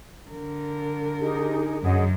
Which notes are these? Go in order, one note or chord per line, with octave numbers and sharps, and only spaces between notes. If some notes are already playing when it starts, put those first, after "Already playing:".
D3 A#4
D#4 G4 G#4
F#2 G#4 D#5 F#5